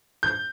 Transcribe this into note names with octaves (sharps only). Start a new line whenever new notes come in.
G6